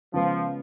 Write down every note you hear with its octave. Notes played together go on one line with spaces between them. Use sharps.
C#3 F3 G#3 B3